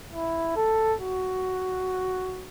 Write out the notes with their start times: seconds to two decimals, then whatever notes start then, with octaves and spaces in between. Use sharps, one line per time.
0.13 E4
0.56 A4
0.99 F#4